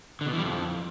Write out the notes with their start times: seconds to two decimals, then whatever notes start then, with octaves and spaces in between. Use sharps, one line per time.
0.21 D3
0.27 B2
0.32 E3
0.38 G3
0.43 F2